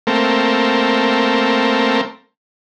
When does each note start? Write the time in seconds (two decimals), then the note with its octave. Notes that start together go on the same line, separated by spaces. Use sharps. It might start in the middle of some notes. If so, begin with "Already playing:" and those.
0.07 A3 A#3 C4